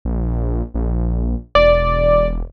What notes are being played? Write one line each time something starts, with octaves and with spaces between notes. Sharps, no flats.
A#1
A#1
E1 D5